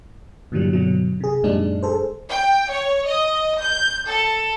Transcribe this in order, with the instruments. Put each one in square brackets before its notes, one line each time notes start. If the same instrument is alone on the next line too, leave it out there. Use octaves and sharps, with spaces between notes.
[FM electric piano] G2 A#2 D3 E3 F#3 G3
G2 B2 D3 F#3
C3 G#4
F#2 A#2 G3 G#3 D4 D#4
G#4 A4 C5
[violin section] G5
C#5
D#5
G6
A4